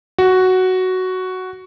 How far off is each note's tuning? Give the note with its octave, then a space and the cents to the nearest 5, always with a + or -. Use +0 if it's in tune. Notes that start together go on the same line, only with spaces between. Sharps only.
F#4 +5